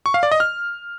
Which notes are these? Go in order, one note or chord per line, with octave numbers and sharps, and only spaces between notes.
C#6
F5
D5
D#5
F6